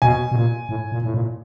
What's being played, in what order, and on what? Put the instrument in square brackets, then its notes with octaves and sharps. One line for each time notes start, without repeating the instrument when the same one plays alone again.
[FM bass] B2 [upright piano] G#5
[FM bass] B2
A#2
A2
A#2
A2
A#2